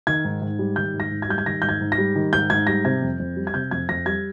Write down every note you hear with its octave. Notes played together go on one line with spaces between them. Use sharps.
D#3 G#6
G#2
G#2
G3
D#3 G6
G#2
A#6
G#2
G#6
G3 G6
G#6
D#3 A#6
G#2 G6
G#6
G#2
A#6
G3
D#3
G#2 G6
G#2 G#6
G3 A#6
C3 G#6
F2
F2
G3
G#6
C3 G6
F2 G#6
F2 A#6
G3 G#6